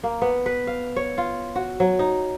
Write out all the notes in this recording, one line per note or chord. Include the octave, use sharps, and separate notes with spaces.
A#3
B3
B4
F5
C#5
F4
F#4
F#3
D#4